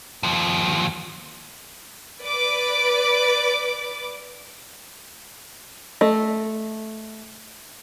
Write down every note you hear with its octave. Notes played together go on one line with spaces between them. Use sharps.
D#2 F3
B4 D5 D6
A3 D#5